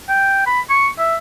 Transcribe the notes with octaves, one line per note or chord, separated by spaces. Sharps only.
G5
B5
C#6
E5